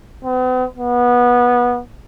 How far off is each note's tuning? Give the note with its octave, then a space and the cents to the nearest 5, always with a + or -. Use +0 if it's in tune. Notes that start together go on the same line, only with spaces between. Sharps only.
B3 +45
B3 -20